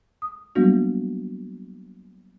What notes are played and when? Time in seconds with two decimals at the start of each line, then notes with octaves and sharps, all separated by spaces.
0.22 D#6
0.55 F#3 G3 A#3 B3 D4 F#4